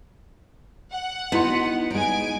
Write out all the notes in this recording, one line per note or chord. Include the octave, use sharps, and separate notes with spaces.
F#5
B3 D#4 E4 F#4 C6
G#3 D#4 G#5 D7